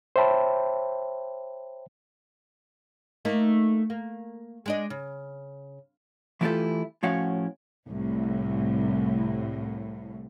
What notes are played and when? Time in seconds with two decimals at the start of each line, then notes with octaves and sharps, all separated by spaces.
0.16 C5 C#5 E5 G5 A5 B5
3.25 A3 A#3 D#4
3.90 A#3
4.66 G#3 D4 D#5
4.90 C#3
6.41 E3 A3 E4 F4 G4 A4
7.03 A2 F3 C#4 F#4 F5 F#5
7.88 C2 A2